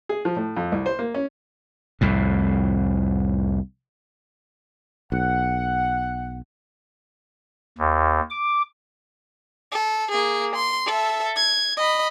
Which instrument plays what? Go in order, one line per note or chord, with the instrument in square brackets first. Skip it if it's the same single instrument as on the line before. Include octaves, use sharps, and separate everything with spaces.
[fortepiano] G#4
F3
A2
F2
C2
C5
A#3
C#4
[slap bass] C2 F2 A2
[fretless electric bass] B1 [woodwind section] F#5
[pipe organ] D#2
D6
[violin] A4
A#3 G#4
C6
A4 E5
G#6
D#5 B5